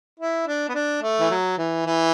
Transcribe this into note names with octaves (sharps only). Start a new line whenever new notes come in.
E4
D4
B3
D4
A3
E3
F#3
E3
E3